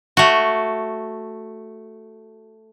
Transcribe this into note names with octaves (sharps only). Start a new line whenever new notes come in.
A3 F#4